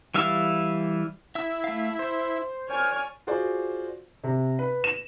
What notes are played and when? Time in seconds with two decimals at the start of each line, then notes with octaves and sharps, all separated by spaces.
0.14 E3 G3 E5 F5 E6
1.35 E4 E5 E6
1.64 A3 F5
1.99 C5
2.69 F#2 C#5 D5 G#5 F6
3.27 F4 F#4 G#4 C5 D5
4.24 C3
4.59 B4
4.84 E7